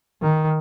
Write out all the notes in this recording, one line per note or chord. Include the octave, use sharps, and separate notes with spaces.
D#3